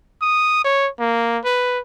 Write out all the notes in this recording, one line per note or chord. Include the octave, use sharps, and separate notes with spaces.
D#6
C#5
A#3
B4